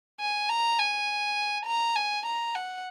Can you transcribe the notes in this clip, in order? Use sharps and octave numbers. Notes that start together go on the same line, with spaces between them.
G#5
A#5
G#5
A#5
G#5
A#5
F#5